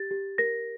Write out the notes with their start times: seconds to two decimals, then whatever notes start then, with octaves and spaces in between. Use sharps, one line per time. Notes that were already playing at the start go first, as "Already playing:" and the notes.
Already playing: G4 A6
0.11 G4
0.38 A#4 A#6